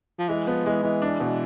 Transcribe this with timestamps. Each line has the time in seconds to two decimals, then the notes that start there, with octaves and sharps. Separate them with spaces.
0.19 F3
0.29 E3 G#3
0.47 F3 B3
0.66 E3 G#3
0.83 E3 G#3
1.02 D4
1.20 B2